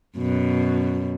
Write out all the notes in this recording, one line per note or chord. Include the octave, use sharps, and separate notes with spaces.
F#2 B2